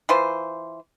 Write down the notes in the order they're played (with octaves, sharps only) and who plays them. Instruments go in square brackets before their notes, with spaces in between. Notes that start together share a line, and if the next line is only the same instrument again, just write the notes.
[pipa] E3 F4 C5